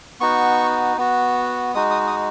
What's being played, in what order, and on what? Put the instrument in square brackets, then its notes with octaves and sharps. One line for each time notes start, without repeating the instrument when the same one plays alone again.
[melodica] B3 D#4 F#4 C#6
B3 F#4
G#3 D#4 F#4 D#6
D#6
D#6